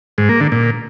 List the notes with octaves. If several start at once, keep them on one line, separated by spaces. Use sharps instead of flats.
G#2
A#3
D3
A#2